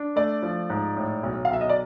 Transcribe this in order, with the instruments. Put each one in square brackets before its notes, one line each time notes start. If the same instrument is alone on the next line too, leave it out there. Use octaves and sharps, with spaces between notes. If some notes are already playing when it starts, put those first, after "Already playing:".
Already playing: [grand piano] D4
[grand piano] A3 [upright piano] D5
[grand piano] F3
G#2
A2
B1
[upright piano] F5
[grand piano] B1 [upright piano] E5
[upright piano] D#5
D5